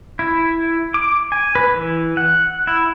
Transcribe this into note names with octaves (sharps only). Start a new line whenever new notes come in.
E4
D6
G#5
B4
E3
F#5
E4